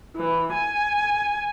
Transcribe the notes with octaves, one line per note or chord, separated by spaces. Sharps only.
E3
G#5